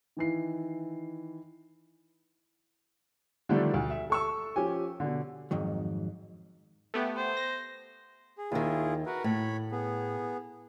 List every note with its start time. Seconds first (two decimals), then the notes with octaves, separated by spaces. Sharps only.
0.17 D#3 E3 C7
3.49 D3 D#3 F3 G3 A3 D4
3.74 D2
3.90 E5
4.10 A4 C#6 E6
4.56 F3 C#4 G4 G#5
5.00 B2 D3
5.51 F2 G#2 D#3 F#3
6.94 A3 B3 G4
7.17 C5
7.37 A#6
8.38 G#4
8.52 D#2 D#3 E4 F4 G#4
9.06 F#4 A#4 B4
9.24 A2 C#5 B5
9.72 B3 G#4